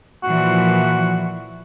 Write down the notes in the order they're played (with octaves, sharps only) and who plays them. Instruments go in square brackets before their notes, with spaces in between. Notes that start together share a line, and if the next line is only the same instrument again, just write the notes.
[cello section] A#2 E3 F3 [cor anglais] F#4